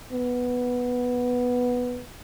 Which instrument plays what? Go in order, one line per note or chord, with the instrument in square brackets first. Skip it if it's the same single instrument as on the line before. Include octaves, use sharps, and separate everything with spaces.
[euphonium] B3